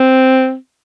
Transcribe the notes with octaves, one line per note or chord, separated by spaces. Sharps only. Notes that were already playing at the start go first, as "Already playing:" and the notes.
Already playing: C4